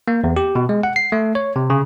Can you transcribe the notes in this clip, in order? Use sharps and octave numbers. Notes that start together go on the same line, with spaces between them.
A#3
E2
G4
B2
G#3
F#5
C7
A3
C#5
C3
C#3